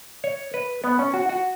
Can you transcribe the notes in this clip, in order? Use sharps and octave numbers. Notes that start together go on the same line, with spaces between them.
C#5
B4
B3
C#4
F#4
F#4